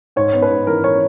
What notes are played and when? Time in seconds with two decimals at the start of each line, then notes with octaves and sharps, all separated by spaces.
0.16 G#2 C#5
0.33 B3
0.42 B4
0.50 G#2
0.67 E3 A#4
0.84 C#5